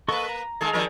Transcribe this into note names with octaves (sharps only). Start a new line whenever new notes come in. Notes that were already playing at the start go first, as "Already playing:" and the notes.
A#3 A4 B4 D#5 C#6
A#5
D#3 G#3 A#3 G#4 A4
D#3 F3 G3 A#4 D5 G5